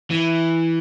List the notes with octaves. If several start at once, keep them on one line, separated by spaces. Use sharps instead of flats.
E3